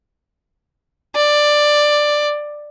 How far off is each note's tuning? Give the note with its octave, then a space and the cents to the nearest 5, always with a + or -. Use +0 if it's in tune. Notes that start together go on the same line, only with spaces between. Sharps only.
D5 +10